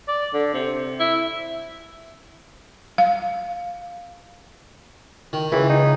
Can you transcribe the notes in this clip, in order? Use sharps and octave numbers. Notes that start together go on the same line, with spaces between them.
D5
D3
C3
E4
F5
D#3
C#2 E3
D#4